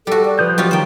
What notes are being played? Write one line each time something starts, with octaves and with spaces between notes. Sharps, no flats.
G3 F#4 A4
D5
F3 B4 D#6 G6
F#3 G3 C#4 F4
D#3 C5 G5